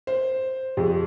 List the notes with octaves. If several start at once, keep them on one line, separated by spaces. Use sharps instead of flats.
C5
F2 G4 G#4